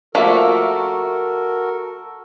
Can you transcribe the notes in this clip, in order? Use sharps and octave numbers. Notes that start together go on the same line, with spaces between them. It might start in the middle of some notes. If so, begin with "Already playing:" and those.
F3 A3 A#3 F#4 A4 A#4 E5